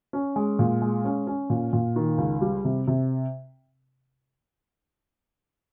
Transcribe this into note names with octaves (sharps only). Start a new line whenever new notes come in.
C#4
G#3
A#2
G#3
C#4
C#4
A#2
A#2
D#3
C#2
G3
C3
C3